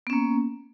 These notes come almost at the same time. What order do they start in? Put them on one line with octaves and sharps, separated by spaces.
B3 C#4 A#3